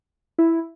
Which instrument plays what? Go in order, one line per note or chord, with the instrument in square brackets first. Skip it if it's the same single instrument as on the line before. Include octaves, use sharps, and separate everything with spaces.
[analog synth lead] E4